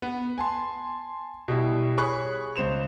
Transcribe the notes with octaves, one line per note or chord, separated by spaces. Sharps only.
B3
G#5 A5 C6
B2 G3 E4
G#4 C#5 B5 C#6 F#6
C#2 C5 E7 F7